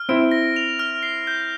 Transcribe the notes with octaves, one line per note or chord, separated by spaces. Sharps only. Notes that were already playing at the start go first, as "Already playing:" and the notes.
Already playing: F6
C4 E4 D7
A#6
F7
F6
C7
G6